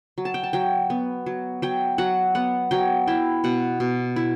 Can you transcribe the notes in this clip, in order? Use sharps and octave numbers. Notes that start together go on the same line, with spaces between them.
F#3
A5
G5
A5
F#3 G5
B3
F#3
F#3 G5
F#3 F#5
B3 F#5
F#3 G5
E4 G5
B2 F#5
B2
E4